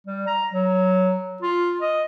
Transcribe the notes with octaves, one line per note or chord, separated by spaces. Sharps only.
G3
A#5
F#3
F4
D#5